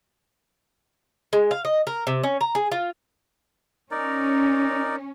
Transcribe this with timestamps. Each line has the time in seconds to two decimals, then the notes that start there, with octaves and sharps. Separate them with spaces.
1.33 G#3
1.51 F5
1.65 D#5
1.87 A#4
2.07 C3
2.24 C#4
2.41 A#5
2.55 G#4
2.72 F4
3.91 C#4 D#4 A#4 D5